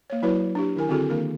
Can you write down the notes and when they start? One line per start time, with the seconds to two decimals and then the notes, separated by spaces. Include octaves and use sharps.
0.10 A#3 C#5
0.22 F#3 E4 F#4 B4 C#5
0.55 D4 G4
0.76 D#3 E4 A#4 G#5
0.89 D3 C4 E4 F#4 G#4 A4
1.10 D#3 A#3 D4 A#4